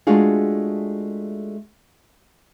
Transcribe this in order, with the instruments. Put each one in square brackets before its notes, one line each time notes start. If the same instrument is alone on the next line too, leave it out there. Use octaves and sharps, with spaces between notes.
[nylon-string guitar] G#3 A3 D4 F4 F#4 G#4